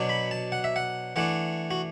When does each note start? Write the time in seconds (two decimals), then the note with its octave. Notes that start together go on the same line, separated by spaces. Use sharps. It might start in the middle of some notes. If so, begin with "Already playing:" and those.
Already playing: B2 F#3 D4
0.09 B5
0.31 A5
0.52 F#5
0.64 E5
0.76 F#5
1.16 E3 A3 D4 F#5
1.71 F#4